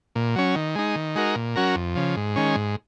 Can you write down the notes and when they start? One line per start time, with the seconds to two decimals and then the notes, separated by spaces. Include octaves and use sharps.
0.15 A#2
0.36 F#3 C#4
0.55 D#3
0.75 G#3 D#4
0.96 D#3
1.15 G#3 D#4 F#4 A#4
1.36 A#2
1.56 F#3 C#4 F#4 A#4
1.76 F2
1.96 C#3 F3
2.16 G#2
2.36 D#3 G#3 C#4
2.56 G#2